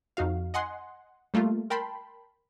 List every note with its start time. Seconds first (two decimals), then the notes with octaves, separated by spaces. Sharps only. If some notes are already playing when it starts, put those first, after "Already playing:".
0.17 F2 D#4 F#4 F5
0.54 D#5 F#5 G#5 C6
1.34 G3 A3 A#3 F4
1.70 A#4 G5 A5 B5 C6